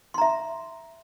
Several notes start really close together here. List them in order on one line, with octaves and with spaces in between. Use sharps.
C6 A#5 E5